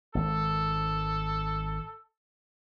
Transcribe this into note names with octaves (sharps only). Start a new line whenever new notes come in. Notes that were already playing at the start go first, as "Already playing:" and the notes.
G#1 A4